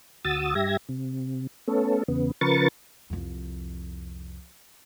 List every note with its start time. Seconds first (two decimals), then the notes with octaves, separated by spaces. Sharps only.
0.25 D2 F#4 D#6 E6 A6
0.55 G2 G4 E5 G#6 A#6
0.89 C3
1.68 A3 B3 C#4 A4
2.08 E2 C#3 B3
2.41 C#3 F3 A#4 B4 C#6 A6
3.10 C2 F2